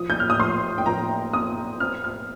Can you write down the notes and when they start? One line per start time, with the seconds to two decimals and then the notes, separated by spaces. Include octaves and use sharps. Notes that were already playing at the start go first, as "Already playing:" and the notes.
Already playing: F3 D#6
0.10 G6
0.20 F6
0.30 D#6
0.39 F3 C6
0.78 G5
0.86 F3 A#5
1.33 F2 D#6
1.80 C4 F6
2.04 F6